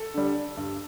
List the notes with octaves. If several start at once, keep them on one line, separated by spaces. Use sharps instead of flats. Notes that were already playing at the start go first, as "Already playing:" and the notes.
Already playing: A4
D3 G3
G2